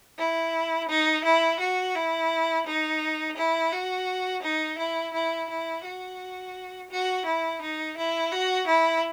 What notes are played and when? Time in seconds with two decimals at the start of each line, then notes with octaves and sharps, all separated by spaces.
0.18 E4
0.89 D#4
1.25 E4
1.60 F#4
1.95 E4
2.66 D#4
3.37 E4
3.72 F#4
4.43 D#4
4.79 E4
5.14 E4
5.50 E4
5.85 F#4
6.90 F#4
7.26 E4
7.62 D#4
7.97 E4
8.32 F#4
8.68 E4